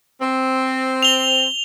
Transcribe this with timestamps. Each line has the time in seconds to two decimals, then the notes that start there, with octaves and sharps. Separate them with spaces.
0.21 C4
1.03 F7 G7